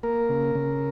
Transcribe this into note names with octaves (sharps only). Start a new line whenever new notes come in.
A#3 A#4
C#3
C#3